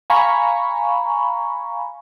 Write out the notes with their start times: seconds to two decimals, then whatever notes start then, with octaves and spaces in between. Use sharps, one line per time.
0.10 F5 G#5 A#5 B5 C#6